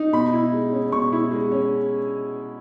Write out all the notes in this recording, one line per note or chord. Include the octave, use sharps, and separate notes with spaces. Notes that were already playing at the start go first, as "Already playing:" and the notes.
Already playing: D#4
B2 B5
E4
G#3
C#4
B2 C#6
E4
G#3
C#4